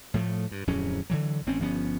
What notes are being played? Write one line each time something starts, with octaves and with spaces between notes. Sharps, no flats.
A2 F3 A3
G2
D1 F2 F#3 C#4
D3 E3 F#3
A1 C4 C#4
G1 F3 B3 C#4